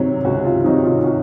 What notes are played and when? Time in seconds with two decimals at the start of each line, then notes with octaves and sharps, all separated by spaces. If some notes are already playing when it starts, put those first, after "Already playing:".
Already playing: C3 D#3 F#3
0.24 C#2 F#4
0.45 F4
0.64 C3 D#3 F#3 D#4
0.85 F4
1.04 F#4